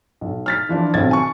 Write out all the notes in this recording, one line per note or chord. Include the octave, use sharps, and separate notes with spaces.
B1
F6 A6 B6
E3 F3 D4 F4
B1 D#3 C4 G#6 A6
G#5 C#6